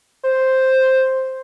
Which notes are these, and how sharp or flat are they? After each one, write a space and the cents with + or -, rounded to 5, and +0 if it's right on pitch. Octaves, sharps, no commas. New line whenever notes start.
C5 +0